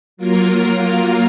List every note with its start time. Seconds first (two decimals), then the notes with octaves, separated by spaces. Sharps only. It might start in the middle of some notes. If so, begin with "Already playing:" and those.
0.17 F#3 A#3 F4 A#4